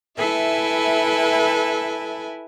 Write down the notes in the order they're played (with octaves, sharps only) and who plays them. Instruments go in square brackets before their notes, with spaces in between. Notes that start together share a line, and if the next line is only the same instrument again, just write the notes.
[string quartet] E4 A4 B4 E5 G#5